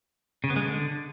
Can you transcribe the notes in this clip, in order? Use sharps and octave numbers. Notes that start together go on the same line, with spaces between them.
C#3
B3
G#3
D3